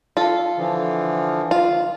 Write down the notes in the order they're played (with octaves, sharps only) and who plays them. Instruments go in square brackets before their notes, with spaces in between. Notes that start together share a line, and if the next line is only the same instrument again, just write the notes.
[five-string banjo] F4 A4
[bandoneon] D3 E3 F3
[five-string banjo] F4